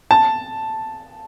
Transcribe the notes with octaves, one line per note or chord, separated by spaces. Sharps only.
A5